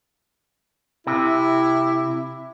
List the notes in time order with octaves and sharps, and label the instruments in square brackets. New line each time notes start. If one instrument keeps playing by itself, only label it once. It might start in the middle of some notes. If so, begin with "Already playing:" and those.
[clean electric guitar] C3 [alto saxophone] E4